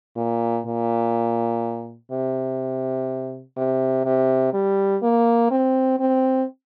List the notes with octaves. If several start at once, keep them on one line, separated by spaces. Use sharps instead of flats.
A#2
A#2
C3
C3
C3
G3
A#3
C4
C4